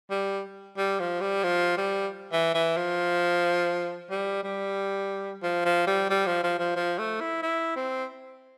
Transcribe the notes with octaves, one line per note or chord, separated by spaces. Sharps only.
G3
G3
F3
G3
F3
G3
E3
E3
F3
G3
G3
F3
F3
G3
G3
F3
F3
F3
F3
A3
E4
E4
C4